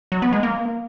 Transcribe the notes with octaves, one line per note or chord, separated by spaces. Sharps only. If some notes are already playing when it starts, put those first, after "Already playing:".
F#3
B3
G#3
A#3